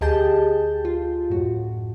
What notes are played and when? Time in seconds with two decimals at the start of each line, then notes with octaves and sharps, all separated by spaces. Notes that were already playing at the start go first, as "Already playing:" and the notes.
0.01 D2 G4 G#4 D#5 A5 G6
0.85 F4
1.30 F#2 A2 F#4